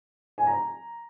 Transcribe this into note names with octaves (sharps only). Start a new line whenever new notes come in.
G#5
A#5